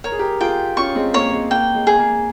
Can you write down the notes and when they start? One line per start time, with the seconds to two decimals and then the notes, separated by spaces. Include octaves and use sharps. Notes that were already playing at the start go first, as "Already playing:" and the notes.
0.04 A#4 C#5
0.12 G#4
0.19 G4 A#4
0.40 F4 G#4 G5
0.77 C#4 F4 C#6
0.95 G#3 C4
1.14 A#3 C#5
1.32 G#3
1.50 A#3 G5
1.75 G#3
1.87 G#4
1.99 A#3